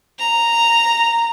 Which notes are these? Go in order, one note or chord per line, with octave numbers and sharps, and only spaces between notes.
A#5